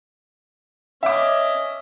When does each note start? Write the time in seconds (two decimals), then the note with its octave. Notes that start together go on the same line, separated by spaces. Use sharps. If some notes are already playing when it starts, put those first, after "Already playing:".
1.03 C#4 D#5 E5 D6